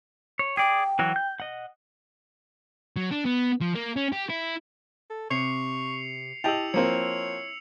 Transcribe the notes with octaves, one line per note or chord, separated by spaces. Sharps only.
C#5
G#4 D5 G5
E3 F#3 F#4
G6
D#5 F#5
F#3
D4
B3
F3
A#3
C#4
G4
E4
A4
C3 C#6 C7 C#7 F7
E4 G4 D#5 G5 A5 E6 F7
F3 A#3 C4 C#5 C#7